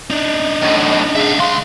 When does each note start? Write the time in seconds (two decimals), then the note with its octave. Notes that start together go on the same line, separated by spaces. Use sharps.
0.10 D4 D#4 D#5
0.62 F#2 A2
1.15 G#4 E5 F5
1.38 C#2 F5 C6